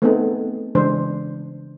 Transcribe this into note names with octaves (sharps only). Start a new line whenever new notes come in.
A3 B3 C4 D#4 G#4 A4
C#3 E3 G#3 D4 C5